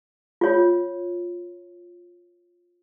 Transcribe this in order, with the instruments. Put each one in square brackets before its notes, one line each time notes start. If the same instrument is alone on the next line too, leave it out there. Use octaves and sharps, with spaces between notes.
[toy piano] F4 C#5